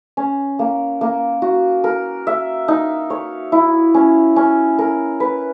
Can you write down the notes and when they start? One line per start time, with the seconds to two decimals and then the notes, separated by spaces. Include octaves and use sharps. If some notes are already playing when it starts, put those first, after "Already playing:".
0.17 C#4
0.59 A#3
1.01 A#3
1.42 F#4
1.84 A#4
2.27 E5
2.68 D#4
3.10 C#5
3.52 E4
3.94 C#4
4.36 C#4
4.79 A#4
5.20 B4